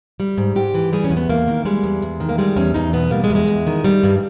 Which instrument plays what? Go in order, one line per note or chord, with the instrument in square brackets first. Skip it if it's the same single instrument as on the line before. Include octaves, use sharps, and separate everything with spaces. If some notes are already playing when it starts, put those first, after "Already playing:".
[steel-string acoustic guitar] G3
G#2
G#2 G4
E3
G3 G#4
C#4
E2
B3
E2 A#3
D#3
G3 G#3
E2
E2
D#3
A#3
G3 G#3
E2 C#4
E2 D#4
B2 B3
G3 A#3
G#3
E2
G#3
E2
D#3
G3
G2